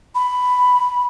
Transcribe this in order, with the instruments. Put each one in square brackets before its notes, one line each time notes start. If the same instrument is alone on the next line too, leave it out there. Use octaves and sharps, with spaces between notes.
[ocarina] B5